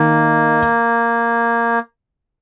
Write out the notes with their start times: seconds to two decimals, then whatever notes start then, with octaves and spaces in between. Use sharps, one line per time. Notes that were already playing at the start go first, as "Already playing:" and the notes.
Already playing: D#3 A#3